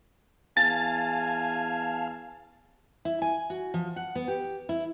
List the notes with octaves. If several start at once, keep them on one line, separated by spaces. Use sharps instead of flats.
E2 F5 G#5 A5 F6 A6
E4
G#5
F#4
F3
F#5
B3
G4
E4